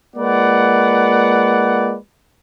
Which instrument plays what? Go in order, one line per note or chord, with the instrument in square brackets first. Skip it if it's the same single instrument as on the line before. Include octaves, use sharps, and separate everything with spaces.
[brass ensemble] G#3 A#3 F4 B4 D5 F#5